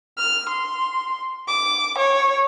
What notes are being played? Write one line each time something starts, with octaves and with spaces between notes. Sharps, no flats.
F6
C6
D6
C#5